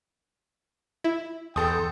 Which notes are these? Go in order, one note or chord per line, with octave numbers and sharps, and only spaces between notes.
E4
E2 A4 G5 C6 D#6